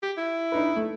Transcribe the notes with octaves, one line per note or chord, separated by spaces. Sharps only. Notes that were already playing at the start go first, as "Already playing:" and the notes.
G4
E4
D4 D#4 B4
A3